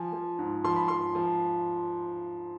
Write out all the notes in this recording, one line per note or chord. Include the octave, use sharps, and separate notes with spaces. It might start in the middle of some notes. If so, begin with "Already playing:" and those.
Already playing: F3 G#5
F3
G#2
F3 C6
B5
F3 C6
F3